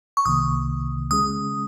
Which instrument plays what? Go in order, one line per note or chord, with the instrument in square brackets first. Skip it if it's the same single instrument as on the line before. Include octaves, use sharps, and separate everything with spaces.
[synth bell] C#6
[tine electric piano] C2 C3 D#3 A#3 [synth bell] D#6
[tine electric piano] C#3 G#3 C#4 G#4 [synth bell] D#6